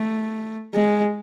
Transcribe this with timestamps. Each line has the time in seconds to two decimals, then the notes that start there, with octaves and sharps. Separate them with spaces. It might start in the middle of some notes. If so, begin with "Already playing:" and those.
Already playing: A3
0.74 G#3